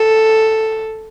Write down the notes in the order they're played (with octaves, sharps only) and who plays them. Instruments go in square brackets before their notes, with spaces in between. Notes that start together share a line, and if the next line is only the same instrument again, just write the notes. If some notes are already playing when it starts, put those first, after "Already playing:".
Already playing: [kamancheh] A4